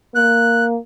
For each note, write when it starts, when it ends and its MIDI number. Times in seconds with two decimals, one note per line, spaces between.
0.15 0.78 58
0.15 0.65 90